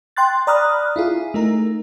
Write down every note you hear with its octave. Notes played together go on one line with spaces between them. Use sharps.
G5 C6 F#6 A6
D5 A#5 B5 D#6 F6 F#6
E4 F4 G#4
A3 D#4 A#4